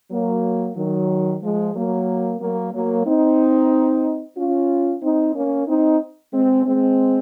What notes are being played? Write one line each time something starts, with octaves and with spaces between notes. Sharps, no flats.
F#3 A#3
D#3 F#3
F3 G#3
F#3 A#3
F#3 A#3
F#3 A#3
C4 D#4
C#4 F4
C4 D#4
A#3 C#4
C4 D#4
G#3 C4
G#3 C4